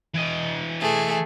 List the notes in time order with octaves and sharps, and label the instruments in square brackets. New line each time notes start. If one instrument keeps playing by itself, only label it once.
[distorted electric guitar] E3 D#5
[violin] A3 G#4